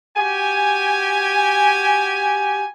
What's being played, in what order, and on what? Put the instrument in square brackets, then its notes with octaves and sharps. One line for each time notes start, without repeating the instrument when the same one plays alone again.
[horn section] F#4 G4 G#5